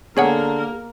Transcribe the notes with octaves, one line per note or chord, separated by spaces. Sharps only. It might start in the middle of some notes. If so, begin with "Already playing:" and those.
D3 A#3 B3 G#4 A#4 C#5 F#5